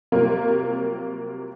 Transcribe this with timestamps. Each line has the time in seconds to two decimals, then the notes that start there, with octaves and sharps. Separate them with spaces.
0.12 C3 F#3 G3 A#3 F4